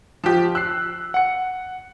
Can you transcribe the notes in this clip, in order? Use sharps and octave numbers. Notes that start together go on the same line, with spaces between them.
F3 G4
E6 F#6 C7
F#5 C#7